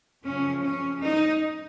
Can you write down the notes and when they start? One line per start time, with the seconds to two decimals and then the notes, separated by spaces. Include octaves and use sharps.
0.24 F#2 C#3 F3 C#4
0.63 C#4
1.02 D#4